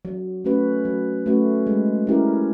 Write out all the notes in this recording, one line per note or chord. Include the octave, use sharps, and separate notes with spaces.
F#3
A3 C#4 F#4 B4
F#3
A3 C#4 F#4 B4
G#3
C#4 E4 G4 A#4